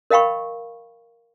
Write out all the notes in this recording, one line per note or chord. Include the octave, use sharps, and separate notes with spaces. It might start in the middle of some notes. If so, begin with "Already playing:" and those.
A#4 D#5 F5 G5 B5 C#6